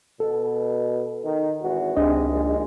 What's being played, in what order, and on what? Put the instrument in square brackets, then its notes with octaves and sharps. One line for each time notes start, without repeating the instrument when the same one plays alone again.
[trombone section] B2 [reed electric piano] A4
[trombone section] D#3
G#1 E2 F#4
[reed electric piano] C#2 D4 D#5 [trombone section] C3 D#3 G#3
[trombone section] A#1 D#2 G#3